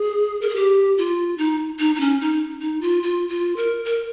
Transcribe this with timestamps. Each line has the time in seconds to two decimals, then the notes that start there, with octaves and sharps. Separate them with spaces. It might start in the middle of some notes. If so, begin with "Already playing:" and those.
Already playing: G#4
0.42 A#4
0.49 G#4
0.56 G4
0.98 F4
1.38 D#4
1.79 D#4
1.95 D#4
2.00 C#4
2.21 D#4
2.61 D#4
2.82 F4
3.03 F4
3.29 F4
3.57 A#4
3.85 A#4